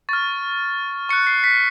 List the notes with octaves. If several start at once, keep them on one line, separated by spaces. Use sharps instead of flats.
C#6 F6 A6
C#6 F#6 C#7
C7
B6